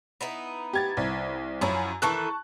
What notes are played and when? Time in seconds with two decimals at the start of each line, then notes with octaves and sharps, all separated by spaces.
0.21 B3 D#4 E4
0.73 G4 G#6 A6
0.97 C2
1.61 F#2 F3 C#4 E4
2.02 D#3 E3 A4 A5 C#6 F#6